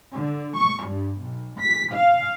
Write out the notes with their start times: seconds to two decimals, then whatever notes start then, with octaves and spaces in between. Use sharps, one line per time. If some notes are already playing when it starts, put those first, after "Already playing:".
0.14 D3
0.56 C#6
0.85 G2
1.18 B1
1.60 B6
1.92 F5